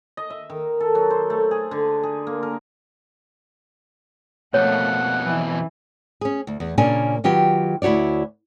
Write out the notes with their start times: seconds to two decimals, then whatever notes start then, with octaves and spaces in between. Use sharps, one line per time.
0.17 D#5
0.30 E5
0.50 D#3
0.80 A4
0.95 F#3
1.10 C5
1.30 A3
1.51 G#4
1.71 D3
2.03 G#4
2.27 A#3
2.43 A#4
4.54 F2 B2 A3 A#3 C#5 F#5
5.24 E3
6.21 C#4 G#4
6.47 D2
6.60 E2
6.78 A#2 C#3 A#3 C#4 D4 G#5
7.24 D#3 F#3 F4 G4 B4 G5
7.82 D2 E4 F#4 C#5 D5